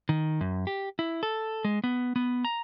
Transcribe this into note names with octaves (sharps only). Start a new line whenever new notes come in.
D#3
F#2
G4
E4
A4
G#3
B3
B3
A#5